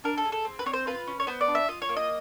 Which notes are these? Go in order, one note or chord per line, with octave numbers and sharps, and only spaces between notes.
D4 A#4
A4
G#4
A4
C4
B4
C4 C#5
C5
F4 B4
C#4
C#5
B3 C5
D5
D4
E5
F4 D#5
C#5
A#3
D#5